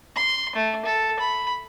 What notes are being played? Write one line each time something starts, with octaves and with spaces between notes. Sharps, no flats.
C6
A3
A4
B5